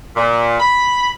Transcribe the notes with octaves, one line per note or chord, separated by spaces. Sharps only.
A#2
B5